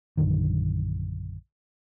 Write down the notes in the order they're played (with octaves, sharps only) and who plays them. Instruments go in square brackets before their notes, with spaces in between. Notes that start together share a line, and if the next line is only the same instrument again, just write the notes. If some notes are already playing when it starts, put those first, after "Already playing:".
[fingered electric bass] A#1 F#2 D3 D#3